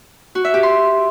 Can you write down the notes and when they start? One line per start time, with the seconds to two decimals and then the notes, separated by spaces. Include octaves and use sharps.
0.35 F#4
0.45 E5
0.54 G4
0.63 C6